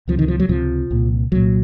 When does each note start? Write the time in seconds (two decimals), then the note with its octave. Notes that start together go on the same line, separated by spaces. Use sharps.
0.08 C#2 C3 F3
0.19 D#3
0.28 F3
0.40 F#3
0.49 C#2 C3 F3
0.91 C2 A#2
1.32 C2 A#2 F#3